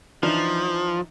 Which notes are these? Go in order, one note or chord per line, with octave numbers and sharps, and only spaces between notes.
E3 F3 D4 D#4